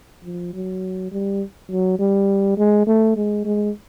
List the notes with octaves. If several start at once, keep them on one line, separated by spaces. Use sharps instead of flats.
F3
F#3
G3
F#3
G3
G#3
A3
G#3
G#3